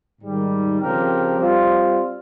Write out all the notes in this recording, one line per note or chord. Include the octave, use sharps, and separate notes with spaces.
G#2 D#3 G3
C#3 F3 C4 G4 A#4
G3 C4 F4